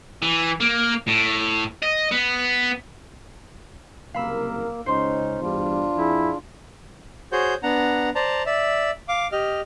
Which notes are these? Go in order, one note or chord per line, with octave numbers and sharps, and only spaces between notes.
E3
A#3
A2
D#5
B3
F#1 C2 A#3 A#4 F5 B5 E6
C#2 C#4 D#4 C5 C6
E2 G2 G3 D4 F4
F2 E4 G#4
F#4 G#4 C5 C#5 G6
B3 D4 F#5 A#5
C5 D5 A5 A#5
D5 E5
F5 D6
G4 D#5 F6